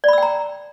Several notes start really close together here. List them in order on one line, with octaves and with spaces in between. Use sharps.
D5 B5 E6 G5 A#5